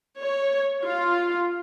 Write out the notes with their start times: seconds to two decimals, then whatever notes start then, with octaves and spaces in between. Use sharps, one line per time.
0.20 C#5
0.83 F4